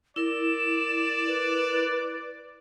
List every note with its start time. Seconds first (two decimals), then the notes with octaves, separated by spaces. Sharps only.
0.16 E4 A#4 D5 E7
1.28 B4